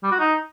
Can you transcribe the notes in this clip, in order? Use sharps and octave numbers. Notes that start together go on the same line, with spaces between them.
G3
F#4
D#4